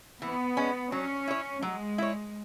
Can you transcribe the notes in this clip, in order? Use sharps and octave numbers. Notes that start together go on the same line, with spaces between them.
E3 B3
G#3 C#4
F#3 C#4
E4 C#5
F#3 G#3
E4 C#5